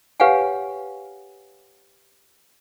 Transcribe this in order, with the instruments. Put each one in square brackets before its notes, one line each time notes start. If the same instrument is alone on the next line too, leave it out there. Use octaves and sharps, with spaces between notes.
[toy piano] G4 B4 C#5 F5 F#5 G#5